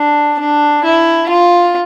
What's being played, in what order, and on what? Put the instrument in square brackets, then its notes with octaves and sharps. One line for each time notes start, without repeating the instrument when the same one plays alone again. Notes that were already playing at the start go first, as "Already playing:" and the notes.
Already playing: [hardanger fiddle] D4
D4
E4
F4